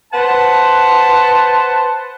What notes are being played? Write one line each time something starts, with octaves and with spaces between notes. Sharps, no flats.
B4 C5 F#5 A5